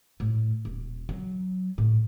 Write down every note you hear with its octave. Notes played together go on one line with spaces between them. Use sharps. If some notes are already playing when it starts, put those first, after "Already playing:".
A2
D#1
F#3
A2